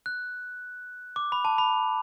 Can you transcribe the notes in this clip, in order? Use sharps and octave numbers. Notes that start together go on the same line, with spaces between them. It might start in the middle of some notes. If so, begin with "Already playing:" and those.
F#6
D6
B5
A5
B5